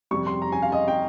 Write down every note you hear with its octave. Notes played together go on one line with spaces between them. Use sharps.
F2 C3 G3 C#6
C6
A#5
G#5
F5
D#5
G5